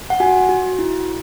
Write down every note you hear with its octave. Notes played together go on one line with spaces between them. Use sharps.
F#5
F#4 G#5
F#4
E4